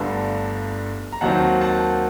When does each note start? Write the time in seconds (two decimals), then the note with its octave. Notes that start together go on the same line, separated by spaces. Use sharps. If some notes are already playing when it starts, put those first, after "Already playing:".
Already playing: G1 G2 D3 A3
1.12 A#5
1.21 D#2 D#3 F#3 C4 F#5 A5
1.61 F#5 A5